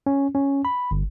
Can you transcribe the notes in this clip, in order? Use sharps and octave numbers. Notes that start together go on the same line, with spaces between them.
C#4
C#4
B5
G1